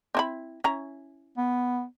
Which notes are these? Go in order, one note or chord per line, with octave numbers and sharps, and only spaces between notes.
C4 E4 B5
C#4 E4 A#5
B3